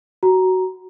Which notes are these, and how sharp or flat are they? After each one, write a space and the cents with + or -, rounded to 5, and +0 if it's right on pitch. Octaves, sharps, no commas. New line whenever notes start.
F#4 +15 A#5 +10